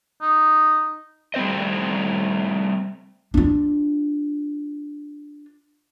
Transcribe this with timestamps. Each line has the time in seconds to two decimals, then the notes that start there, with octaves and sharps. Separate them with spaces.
0.22 D#4
1.34 G3 A3 C4 C5 D#5
3.34 D4 F4